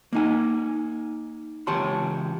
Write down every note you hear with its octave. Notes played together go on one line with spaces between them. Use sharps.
A#3 D#4 G#5
C#2 E3 G4 C#5 A5 C6